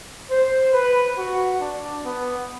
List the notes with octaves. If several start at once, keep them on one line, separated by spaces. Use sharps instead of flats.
C5
B4
F#4
D4
B3